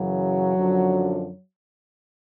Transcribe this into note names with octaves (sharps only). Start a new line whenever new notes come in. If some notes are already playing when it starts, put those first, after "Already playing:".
Already playing: F#2 C#3 E3 F#3
F#2 D3 F3